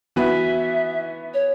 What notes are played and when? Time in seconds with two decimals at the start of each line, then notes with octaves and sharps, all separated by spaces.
0.16 E3 B3 F#4 B4 E5
1.33 C#5